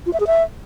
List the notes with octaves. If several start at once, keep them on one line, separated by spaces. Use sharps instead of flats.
F4
E5
G#4
E5